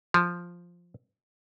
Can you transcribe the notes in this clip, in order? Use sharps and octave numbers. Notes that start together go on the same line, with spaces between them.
F3